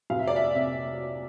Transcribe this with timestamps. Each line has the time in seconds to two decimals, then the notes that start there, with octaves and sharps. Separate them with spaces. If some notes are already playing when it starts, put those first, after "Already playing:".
0.10 F1 F5
0.19 E5
0.27 D5
0.36 E5
0.55 C3 E5